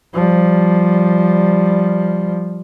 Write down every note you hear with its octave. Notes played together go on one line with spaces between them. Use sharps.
F3 G3